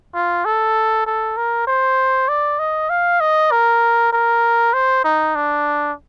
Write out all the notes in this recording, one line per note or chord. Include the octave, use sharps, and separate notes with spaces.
F4
A4
A4
A#4
C5
D5
D#5
F5
D#5
A#4
A#4
C5
D#4
D4